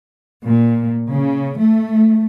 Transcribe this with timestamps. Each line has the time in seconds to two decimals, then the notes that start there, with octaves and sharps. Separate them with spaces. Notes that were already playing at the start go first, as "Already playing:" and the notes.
0.48 A#2
1.10 C#3
1.58 A3